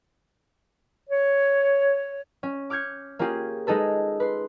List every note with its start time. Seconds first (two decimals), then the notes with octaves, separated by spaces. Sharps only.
1.10 C#5
2.43 C#4
2.70 D6 F6 G6 G#6 C#7
3.19 A#3 C#4 F4 G4 G#4
3.67 G#3 D#4 G#4 A4 B4
4.20 B4 C6